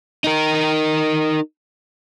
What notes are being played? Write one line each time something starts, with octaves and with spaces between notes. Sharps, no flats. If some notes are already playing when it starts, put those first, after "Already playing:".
D#4 A#4